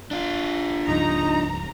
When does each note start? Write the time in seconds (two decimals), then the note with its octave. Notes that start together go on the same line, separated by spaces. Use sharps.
0.11 D4 F4
0.88 C#2 G2 F3 D#4 A#5